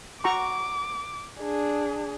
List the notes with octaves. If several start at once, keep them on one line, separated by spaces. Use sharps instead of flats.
F#4 A#5 C#6 D6
D4 G#4